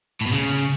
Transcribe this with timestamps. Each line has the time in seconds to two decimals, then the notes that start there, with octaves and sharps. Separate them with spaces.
0.21 A2
0.27 B2
0.32 C#3